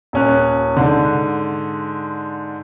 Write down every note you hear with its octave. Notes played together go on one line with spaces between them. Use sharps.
D#1 C#4 F#6
G#2 D3